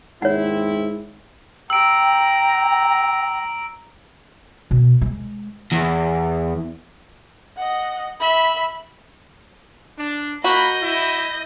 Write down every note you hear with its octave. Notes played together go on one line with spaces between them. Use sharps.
D#2 G#2 C4 E4 C#5 F#5
G5 A#5 E6 D7
B2
G#3
E2
D#5 F#5
E5 B5
D4
A#3 F#4 D#5 A#5 B5 G6
E4